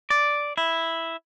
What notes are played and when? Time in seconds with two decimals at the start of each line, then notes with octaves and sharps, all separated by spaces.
0.10 D5
0.58 E4